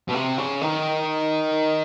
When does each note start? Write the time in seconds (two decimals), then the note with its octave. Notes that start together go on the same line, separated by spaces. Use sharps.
0.08 B2
0.14 C3
0.38 C#3
0.61 D#3